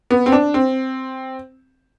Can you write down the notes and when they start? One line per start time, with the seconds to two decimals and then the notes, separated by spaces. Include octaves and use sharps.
0.11 B3
0.26 C4
0.32 D4
0.54 C4